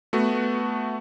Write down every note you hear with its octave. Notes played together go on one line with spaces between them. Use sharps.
A3 B3 F#4